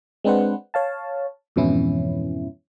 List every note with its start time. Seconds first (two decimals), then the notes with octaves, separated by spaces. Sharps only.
0.24 G#3 C4 D4 B4 C5 F#5
0.74 C#5 F5 A5
1.56 F2 G#2 B2 E3 C#4 E4